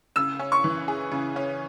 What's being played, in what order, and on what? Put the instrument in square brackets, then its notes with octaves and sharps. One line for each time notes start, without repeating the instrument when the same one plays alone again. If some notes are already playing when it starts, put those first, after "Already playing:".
[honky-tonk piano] C#3 [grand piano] E6
[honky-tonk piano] C#4
[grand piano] C#6
[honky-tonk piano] E3
G#4
C#3
C#4